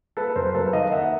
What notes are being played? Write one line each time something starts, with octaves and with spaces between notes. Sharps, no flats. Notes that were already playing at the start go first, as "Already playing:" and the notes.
A#3 A4 B4
F#2 A#4 C5
F#3 A4 B4
D#3 D#5 F5
A#3 E5 F#5